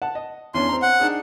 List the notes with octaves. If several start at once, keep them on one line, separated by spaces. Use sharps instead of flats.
F#5 A5
D#5
E2 C#4 D4 C6
C4 A#5
F#5
D4 D#4 G#4